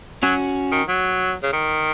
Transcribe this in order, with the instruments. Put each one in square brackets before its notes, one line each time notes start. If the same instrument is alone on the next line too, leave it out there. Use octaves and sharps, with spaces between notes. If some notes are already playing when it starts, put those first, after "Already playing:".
[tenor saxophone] F#3 [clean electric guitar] C#4 F#4
[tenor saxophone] D#3
F#3
C#3
D#3